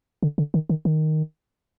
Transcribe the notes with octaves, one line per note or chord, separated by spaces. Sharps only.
D3
D3
D#3
D#3
D#3